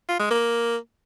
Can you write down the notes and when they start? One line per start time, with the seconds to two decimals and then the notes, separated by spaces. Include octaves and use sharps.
0.09 F4
0.20 G#3
0.31 A#3